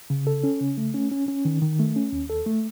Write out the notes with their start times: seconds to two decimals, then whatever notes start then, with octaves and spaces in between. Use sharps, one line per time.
0.10 C#3
0.27 A4
0.44 C#4
0.61 C#3
0.78 A3
0.94 C#4
1.12 C#4
1.28 C#4
1.45 D#3
1.62 D#3
1.79 A3
1.96 C#4
2.13 D#2
2.30 A4
2.46 A3